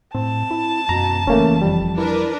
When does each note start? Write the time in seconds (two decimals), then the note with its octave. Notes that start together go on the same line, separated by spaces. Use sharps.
0.15 A2 C4 A5
0.51 E4
0.89 F#2 B2 A#5
1.27 F#1 E3 A3 A#3 C#4
1.62 F2 G3
1.98 D4 E4 A#4 B4